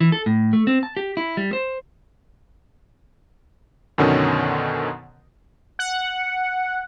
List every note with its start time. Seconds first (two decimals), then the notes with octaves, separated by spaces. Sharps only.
0.01 E3
0.12 A4
0.26 A2
0.53 A3
0.67 C4
0.83 A5
0.97 G4
1.17 E4
1.37 G3
1.53 C5
3.98 F#2 B2 D3 D#3 C#4
5.79 F#5